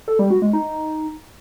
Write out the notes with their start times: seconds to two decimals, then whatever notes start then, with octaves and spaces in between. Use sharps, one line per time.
0.08 A4
0.19 G3
0.31 F#4
0.42 G#3
0.53 D#4